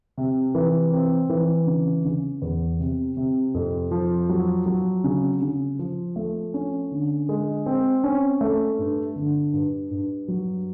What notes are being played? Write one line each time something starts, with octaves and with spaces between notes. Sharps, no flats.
C3
E3
C4
E3
C#3
C#3
E2
C3
C3
F2
F3
F#3
F#3
C#3
C#3
F3
A3
C#4
D3
G#3
C4
C#4
A3
G2
D3
G2
G2
F#3